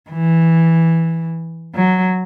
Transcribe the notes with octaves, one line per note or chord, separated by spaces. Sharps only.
E3
F#3